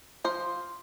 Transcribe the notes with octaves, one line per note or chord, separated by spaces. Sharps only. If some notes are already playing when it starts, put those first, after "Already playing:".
F3 C5